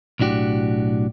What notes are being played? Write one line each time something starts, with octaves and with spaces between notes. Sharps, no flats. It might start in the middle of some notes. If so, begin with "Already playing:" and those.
B1 A2 D4 F#4 G4